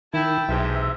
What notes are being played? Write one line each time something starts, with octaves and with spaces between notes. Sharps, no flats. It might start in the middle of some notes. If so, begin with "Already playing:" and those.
D#3 E4 G5 A5
B1 G#2 C3 E3 E5